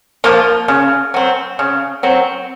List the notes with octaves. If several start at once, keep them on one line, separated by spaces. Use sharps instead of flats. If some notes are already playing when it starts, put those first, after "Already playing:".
F3 A#3 F4
C#3
F#3 C4
C#3
F#3 C4